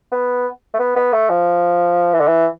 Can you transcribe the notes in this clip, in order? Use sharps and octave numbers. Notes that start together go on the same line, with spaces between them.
B3
A3
B3
B3
A3
F3
E3
D3
E3